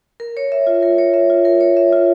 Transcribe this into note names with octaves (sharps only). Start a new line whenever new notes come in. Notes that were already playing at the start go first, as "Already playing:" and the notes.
A#4
C#5
E5
F4
A#4
C#5
E5
F4
A#4
C#5
E5
F4